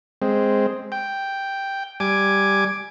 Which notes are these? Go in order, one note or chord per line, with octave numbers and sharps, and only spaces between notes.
G#3 C4
G5
G3 G#5 D6